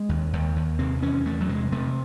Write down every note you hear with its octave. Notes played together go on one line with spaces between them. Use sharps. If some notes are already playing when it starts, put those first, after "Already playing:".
Already playing: G#3
D#2
D#2
D#2
C3 C4
E2 C#4
E2 A3
F#3
C3 G#3
C3 A3